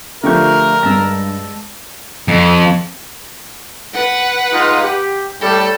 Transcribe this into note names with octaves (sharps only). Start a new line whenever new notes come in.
D3 F3 A3 G4 A#4 C#6 G6
G2 G#3 A5 E6 A#6
F2
B4 F#5
G#3 D#4 F4
G4
A2 G3 A4